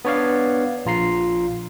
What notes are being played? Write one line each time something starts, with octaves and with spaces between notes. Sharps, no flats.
B3 D4 C#5 D5 F5
A#1 F4 A#5 C7